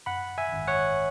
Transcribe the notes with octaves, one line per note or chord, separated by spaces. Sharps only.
F#2 F#5 B5
E5 G#5
G#1
C#5 F#5